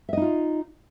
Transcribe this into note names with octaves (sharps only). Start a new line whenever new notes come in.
D#4 F4 D#5 E5